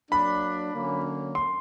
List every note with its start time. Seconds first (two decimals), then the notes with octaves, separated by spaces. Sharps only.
0.11 F#3 A#3 D4 B5
0.73 D3 F#3 A#3 C#4
1.35 C6